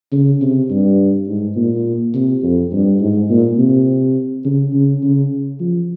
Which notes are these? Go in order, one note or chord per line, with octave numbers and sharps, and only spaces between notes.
C#3
C3
G2
G#2
A#2
C3
F2
G2
G#2
A#2
C3
C#3
C#3
C#3
F3